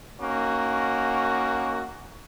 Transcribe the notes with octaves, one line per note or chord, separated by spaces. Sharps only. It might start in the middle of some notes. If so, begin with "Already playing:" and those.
A#3 C#4 D#4 F#4